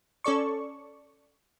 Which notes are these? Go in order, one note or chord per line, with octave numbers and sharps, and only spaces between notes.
C#4 A4 D5 C#6